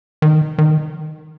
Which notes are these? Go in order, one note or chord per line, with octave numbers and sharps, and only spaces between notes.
D#3
D#3